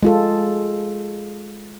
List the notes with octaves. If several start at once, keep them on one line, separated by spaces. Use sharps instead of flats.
G#3 F4 A4